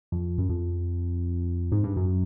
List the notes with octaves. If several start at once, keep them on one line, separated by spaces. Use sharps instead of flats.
F2
F#2
F2
G#2
G2
F#2